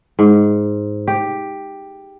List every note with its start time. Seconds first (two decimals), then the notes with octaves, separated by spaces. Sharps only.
0.19 G#2
1.08 G4